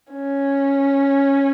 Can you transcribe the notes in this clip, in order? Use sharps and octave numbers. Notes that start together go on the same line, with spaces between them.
C#4